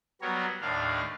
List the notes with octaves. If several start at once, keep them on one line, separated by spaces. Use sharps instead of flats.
F#3 G3 B3 A#4 C#5
D#2 A2 D4 F5